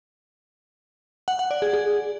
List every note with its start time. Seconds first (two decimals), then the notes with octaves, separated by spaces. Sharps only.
1.28 F#5
1.39 F#5
1.51 D5
1.62 G#4
1.73 G#4